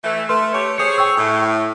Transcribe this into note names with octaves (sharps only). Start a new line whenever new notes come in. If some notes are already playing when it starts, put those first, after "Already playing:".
E3 A3
A3 B4 C6 F6
A3 G4 C#5
G#4 C5 C#5 D#6 C#7
G5 C#6 E6
A2